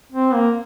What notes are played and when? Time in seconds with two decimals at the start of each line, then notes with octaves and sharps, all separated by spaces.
0.12 C4
0.33 A#3